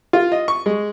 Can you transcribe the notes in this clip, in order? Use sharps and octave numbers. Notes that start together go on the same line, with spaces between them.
F4
D#5
C#6
G#3